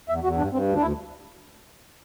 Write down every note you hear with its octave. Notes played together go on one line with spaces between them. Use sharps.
E2 E5
E2 F#4
G2 D4
G2 C4
D2
D4
D2 E4